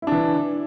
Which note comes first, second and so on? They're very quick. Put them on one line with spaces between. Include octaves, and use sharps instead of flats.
E4 D4 E3